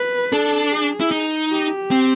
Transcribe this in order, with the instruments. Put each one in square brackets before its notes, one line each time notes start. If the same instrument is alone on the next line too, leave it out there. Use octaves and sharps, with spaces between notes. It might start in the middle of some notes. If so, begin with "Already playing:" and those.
Already playing: [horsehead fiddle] B4
[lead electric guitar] D4 [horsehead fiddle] A4
[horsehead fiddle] G#4
[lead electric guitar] E4
D#4
[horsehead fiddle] G4
[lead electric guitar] C4